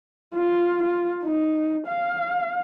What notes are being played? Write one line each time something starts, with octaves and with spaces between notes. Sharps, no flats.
F4
F4
D#4
F5